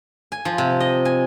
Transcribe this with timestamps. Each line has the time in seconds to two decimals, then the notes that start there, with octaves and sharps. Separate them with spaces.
0.32 G#5
0.45 F3
0.58 C3
0.80 D#5
1.05 G#5